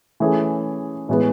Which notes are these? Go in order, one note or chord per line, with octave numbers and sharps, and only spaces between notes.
E3 A3 C#4 G#4
A2 E3 G#3 B3